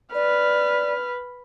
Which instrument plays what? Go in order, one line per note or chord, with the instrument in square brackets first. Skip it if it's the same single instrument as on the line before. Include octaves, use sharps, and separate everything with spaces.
[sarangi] B4 [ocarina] D5 [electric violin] F6